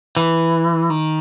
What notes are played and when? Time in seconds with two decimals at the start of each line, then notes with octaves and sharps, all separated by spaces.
0.17 E3
0.90 D#3